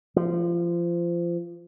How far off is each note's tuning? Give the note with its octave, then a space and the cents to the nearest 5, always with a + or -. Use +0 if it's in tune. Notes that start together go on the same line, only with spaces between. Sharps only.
F3 -25